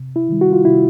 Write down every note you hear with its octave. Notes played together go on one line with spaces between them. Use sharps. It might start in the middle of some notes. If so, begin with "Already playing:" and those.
Already playing: C3
E4
D#3 G3
F#4
F4
C3 E4